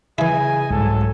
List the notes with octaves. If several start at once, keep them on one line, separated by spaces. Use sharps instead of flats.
C#3 E3 E4 G#4 D#5 G#5
C2 G#2 F#3 A4